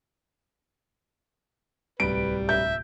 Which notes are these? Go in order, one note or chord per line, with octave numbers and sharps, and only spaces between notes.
D1 C2 G3 B4 D7
E5 G6